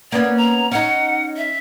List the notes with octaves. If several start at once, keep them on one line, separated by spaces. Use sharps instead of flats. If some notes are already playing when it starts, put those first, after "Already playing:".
A#3 B3 C#4 D5
A#5
C#4 D#4 F#5
E5